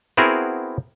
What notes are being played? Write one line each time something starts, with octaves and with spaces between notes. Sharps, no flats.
B3 C4 E4 F#4 G#4 A#4